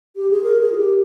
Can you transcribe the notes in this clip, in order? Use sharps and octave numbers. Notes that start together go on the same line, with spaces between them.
G4
G#4
A#4
G#4
F4
G4